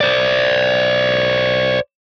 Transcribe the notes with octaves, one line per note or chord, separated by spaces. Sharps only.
C5 D5